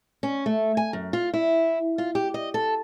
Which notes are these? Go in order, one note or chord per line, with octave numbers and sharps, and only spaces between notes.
C#4
A3
G#5
F#2
F4
E4
F4
G4
D#5
A4